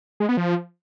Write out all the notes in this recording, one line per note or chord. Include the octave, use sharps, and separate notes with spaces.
G#3
B3
F3